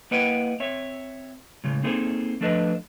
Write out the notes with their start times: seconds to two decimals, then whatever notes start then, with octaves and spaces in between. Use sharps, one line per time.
0.11 A#3 E4 B4 D#5 F#5 G5
0.60 C4 C#5 E5
1.64 A2 C#3 G#3
1.83 A#3 C4 D#4 G#4 A4 C5
2.41 F3 A3 D4 A4 B4 D#5